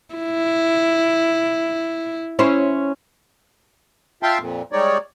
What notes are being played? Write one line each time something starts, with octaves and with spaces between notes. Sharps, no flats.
E4
C#4 E4 C5
F4 E5 F5 G5 A5 C6
F2 A#2
G3 G#3 D#4 C#5 D5